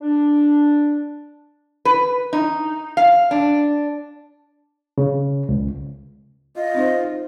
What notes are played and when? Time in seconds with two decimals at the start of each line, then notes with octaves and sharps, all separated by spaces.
0.02 D4
1.85 B4
2.33 D#4
2.97 F5
3.31 D4
4.98 C#3
5.49 C#2
6.56 F4 D#5
6.74 C4 D#4 C5